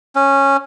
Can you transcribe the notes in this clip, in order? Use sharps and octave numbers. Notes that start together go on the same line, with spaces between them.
C#4